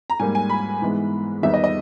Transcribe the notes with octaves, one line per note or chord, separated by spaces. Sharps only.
A#5
G#2 G3 A#3 G#5
G#5
B5
G#2 E3 G#3 B3
E2 D#3 G3 B3 D#4 E5
D#5
D#5